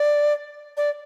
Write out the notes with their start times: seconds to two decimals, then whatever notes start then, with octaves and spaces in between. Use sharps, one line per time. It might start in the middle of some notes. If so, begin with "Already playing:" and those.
Already playing: D5
0.77 D5